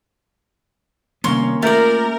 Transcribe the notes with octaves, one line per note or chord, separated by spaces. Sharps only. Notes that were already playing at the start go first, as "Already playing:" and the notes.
C3 D#3 G3 A#3 B3 C#4 C#5 C6
A3 F4 A#4 D5 E5 G6